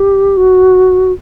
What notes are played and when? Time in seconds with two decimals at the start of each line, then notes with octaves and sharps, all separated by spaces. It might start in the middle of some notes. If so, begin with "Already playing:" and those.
Already playing: G4
0.37 F#4